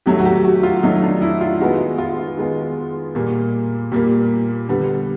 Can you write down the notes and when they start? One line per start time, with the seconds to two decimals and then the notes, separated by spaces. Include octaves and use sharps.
0.06 D#3 F#3 A3 G4
0.19 F#4
0.25 G4
0.44 F#4
0.63 F4
0.83 D#3 F#3 A3 D#4
1.03 D4
1.22 E4
1.41 F4
1.60 D#3 G#3 B3 F#4
1.98 F4
2.38 D#3 G#3 B3
3.15 A#2 G3 A#3
3.92 A#2 G3 A#3 G4
4.68 D3 G3 B3